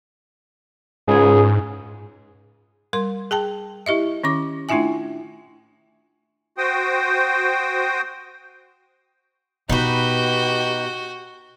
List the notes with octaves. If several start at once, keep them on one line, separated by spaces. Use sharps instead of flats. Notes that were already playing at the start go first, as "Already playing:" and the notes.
C#2 G#2 G#4
G3 A#4 C6
G#4 G5 A5
E4 G4 D#5 E5
D#3 C#4 D6
A3 D4 E4 F4 E5 G#5
F#4 C5 G5 D#6
B2 D#4 F#4 G4 B4 G6